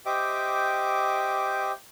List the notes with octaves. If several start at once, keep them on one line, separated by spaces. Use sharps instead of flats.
G4 C5 D#5 E5 G5 D6